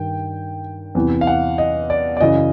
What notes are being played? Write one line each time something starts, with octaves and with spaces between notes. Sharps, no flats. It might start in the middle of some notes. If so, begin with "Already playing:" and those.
Already playing: G2 D#3 G5
E2 C3 E3
F5
F#5
D#5
D5
D5
F#2 C#3 E3 D#5